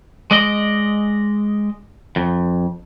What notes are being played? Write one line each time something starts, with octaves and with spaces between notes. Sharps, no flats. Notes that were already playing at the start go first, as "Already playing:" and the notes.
G#3 D5 D#5
F2